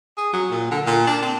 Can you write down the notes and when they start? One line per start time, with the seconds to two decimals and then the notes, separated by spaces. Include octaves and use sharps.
0.17 G#4
0.33 F#3
0.51 A#2
0.71 D3
0.86 A#2
1.07 D4
1.22 C4